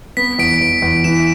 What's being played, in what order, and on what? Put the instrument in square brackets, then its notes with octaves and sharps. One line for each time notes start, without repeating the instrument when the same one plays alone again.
[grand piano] B3 [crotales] B6
[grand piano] E2 [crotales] D7
[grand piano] E2
E2
[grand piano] E3 [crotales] E7